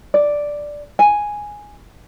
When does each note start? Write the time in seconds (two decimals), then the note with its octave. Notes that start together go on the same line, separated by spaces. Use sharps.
0.14 D5
0.99 G#5